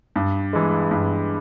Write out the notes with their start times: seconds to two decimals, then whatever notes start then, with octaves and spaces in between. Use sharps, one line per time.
0.16 G2
0.53 E3 G#3
0.91 G2